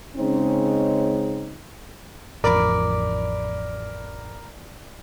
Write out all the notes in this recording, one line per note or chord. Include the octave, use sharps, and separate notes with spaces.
C#3 G#3 C4 C#4 D#4
A1 F2 A#4 D5 B5